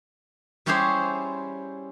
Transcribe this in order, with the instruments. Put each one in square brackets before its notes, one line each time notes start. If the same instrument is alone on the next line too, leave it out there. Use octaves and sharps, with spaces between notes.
[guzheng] G3 C#4 E4 G4 G#4 C5